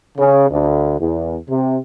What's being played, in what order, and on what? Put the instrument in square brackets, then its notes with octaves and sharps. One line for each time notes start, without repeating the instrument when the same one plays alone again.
[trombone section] C#3
D2
E2
C3